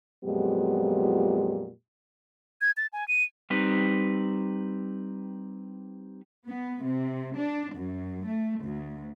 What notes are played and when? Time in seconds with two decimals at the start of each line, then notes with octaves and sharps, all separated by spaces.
0.24 F2 A#2 F#3 G#3 B3 G4
2.61 G#6
2.77 A6
2.93 G#5
3.08 D#7
3.50 G3 C4 D#4 B4
6.48 B3
6.83 C3
7.38 D4
7.75 F#2
8.26 A3
8.61 D2